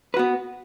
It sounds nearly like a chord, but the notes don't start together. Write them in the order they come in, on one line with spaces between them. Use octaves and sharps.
B4 F#4 B3